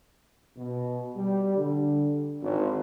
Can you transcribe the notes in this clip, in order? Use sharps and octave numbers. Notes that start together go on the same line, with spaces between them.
B2
G3
D3
G#1